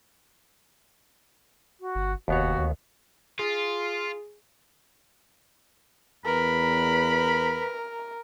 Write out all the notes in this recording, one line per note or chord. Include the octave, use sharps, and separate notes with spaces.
F#4
G1
F1 D#2 B3 F#4 C#5
D2
F4 G#4
E2 A#4 B4 B5